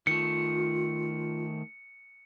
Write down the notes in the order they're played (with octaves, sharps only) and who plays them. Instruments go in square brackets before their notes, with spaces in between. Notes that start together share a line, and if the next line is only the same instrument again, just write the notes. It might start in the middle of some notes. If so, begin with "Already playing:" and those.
[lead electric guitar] D#3 A3 [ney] F4 [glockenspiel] C#7